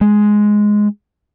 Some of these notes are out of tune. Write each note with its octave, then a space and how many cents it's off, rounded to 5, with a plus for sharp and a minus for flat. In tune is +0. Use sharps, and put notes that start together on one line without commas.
G#3 +5